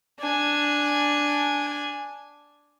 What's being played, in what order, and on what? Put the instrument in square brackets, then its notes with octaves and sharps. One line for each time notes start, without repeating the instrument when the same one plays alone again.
[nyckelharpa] D4 G#5